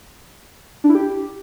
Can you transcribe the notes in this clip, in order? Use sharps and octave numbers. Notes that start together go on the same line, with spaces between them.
D4
E4
G4